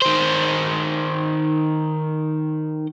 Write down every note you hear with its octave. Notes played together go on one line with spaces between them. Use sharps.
D#3 C5